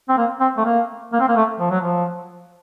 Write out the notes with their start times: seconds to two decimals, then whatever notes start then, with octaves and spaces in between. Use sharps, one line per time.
0.09 C4
0.17 A#3
0.40 C4
0.58 A3
0.65 A#3
1.13 A#3
1.20 C4
1.28 A#3
1.36 A3
1.60 F3
1.71 F#3
1.81 F3